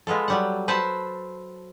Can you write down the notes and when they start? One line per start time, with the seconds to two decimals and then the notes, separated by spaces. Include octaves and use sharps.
0.07 G#3 B3 F4 A4
0.28 F#3 G3 F#5
0.68 B4 C5 E5 F#5 A5